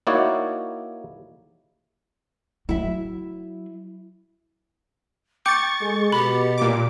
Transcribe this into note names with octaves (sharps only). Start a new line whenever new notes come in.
A#3 D#4 E4 F#4 C#5 D5
F#3 E4 E5
G5 C#6 D6 G6 A6 C#7
G#3 G#4 A4
B2 G4 B5
A#2 D6